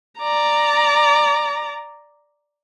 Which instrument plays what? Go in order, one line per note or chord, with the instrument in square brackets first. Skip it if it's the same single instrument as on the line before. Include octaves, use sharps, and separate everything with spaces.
[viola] D5 A#5